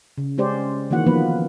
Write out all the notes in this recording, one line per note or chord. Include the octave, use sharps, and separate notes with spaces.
C#3
G#3 C#4 G4 C5 D5
D#3 E3 A#3 F#4 F#5
D#3 F3 A#3 B3 B4